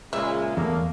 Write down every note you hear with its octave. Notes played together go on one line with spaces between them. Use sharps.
A#2 C#3 G#3 E5
E2 A3 A#3